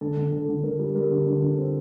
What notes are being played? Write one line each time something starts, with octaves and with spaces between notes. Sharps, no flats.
D3 A4
D3
D3 A4
D3
D3 A#4
G3
G3 A#4
D3
D3
D3
C4